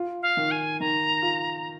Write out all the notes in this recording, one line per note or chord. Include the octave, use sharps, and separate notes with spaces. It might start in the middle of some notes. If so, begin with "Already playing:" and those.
Already playing: F4
F5
D#3
G#5
D#3 A#5
F4